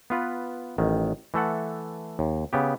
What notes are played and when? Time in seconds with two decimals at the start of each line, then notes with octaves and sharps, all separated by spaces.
0.10 B3 F4 B4
0.78 A1 D#3
1.34 E3 A3 A4 F#5
2.19 D#2
2.53 C#3 B3 G4